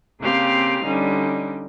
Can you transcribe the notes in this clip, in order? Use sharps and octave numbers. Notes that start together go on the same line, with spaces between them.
C#3 A#3 C4 G4 F5 F6
D3 G3 C#4 D#4